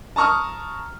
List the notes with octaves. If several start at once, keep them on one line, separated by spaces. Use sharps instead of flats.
A5 A#5 C#6 D#6 F6